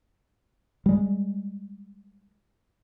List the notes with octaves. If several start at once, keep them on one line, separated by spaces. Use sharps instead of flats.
G3 G#3